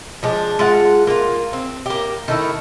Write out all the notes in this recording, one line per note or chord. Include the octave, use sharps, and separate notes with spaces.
F3 G#3 D4
G#3 F4 F5 F#5
A#3 F4
C4
A#3 G4
D#3 A3 E4